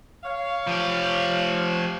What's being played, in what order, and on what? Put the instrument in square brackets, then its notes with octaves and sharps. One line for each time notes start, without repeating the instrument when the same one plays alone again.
[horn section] C#5 F5
[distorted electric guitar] F3 G4